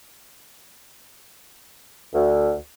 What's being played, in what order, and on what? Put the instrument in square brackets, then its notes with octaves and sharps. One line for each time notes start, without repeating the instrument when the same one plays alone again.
[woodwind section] D2